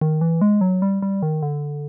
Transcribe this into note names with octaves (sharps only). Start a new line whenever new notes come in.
D#3
E3
G#3
F#3
G3
G3
D#3
D3